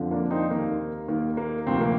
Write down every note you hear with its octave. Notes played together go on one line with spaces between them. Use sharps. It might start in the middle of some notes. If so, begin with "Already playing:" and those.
Already playing: F2 D3 F3
A#3 D4
C4 D#4
D#2 D#3 A#3
D#2 D#3 A#3
A#3
D2 C3 F3 C4
A#3